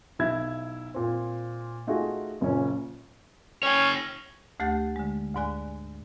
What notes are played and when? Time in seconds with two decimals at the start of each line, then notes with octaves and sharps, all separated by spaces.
0.19 B1 E4 G#6
0.94 A#2 C4
1.87 A3 D#4 F4 F#4 G#4
2.41 F#1 F#2 A#2 C#4
3.63 C#4 C#5 G5
4.60 D2 A3 G4 F#5 F#6 A6
4.96 D3 G#3
5.35 D2 G#2 D5 G#5 F#6